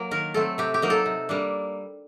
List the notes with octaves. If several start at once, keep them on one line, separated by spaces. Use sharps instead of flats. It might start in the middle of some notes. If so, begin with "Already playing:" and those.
Already playing: F#3 A#3
D#3 A#4
F#3 A3 C4 A4
C3 G4
G4
F#3 A#3 D#4
A4
C3
G3 A#3 D4